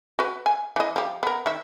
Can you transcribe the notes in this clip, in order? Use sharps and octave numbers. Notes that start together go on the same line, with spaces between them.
F#4 B4
G#5
E3 D#5
F3 G4
B3 A#4
D#3 E5